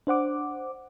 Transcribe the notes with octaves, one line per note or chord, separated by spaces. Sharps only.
D4 C5 F#5 D6